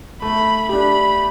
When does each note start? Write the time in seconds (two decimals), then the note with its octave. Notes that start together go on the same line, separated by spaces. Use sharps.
0.22 A3 B5
0.69 D4 G4 B5